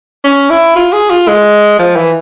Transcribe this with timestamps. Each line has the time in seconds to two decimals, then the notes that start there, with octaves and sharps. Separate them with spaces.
0.24 C#4
0.50 E4
0.76 F4
0.93 G#4
1.10 F4
1.28 G#3
1.79 F3
1.96 E3